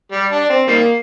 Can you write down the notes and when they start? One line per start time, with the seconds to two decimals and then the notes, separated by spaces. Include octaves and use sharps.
0.12 G3
0.31 D4
0.49 C4
0.68 D#3 G3 A#3